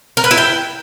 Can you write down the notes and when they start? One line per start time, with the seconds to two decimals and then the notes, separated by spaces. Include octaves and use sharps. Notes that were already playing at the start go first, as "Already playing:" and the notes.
0.17 A#4
0.24 B4
0.31 E4
0.38 G5